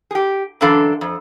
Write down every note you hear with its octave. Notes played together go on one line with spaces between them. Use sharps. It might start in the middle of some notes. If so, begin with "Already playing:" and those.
G4 G#4
F#2 D3 E3 D4 A4 F5
F2